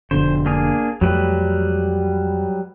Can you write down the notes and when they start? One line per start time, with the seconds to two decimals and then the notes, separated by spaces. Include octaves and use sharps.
0.11 F1 B2 D3 C5
0.46 A#3 D4 G#4
1.01 F2 F#3 G3 A3 B4